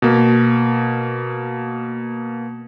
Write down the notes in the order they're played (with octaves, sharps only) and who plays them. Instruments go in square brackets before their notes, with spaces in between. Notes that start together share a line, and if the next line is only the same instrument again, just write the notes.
[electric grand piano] B2 A#3